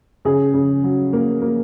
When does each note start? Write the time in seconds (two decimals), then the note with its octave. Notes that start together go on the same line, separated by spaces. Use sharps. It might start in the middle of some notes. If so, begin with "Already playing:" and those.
0.25 C#3 G#4
0.54 C#3
0.84 F#3
1.13 A#3
1.42 A#3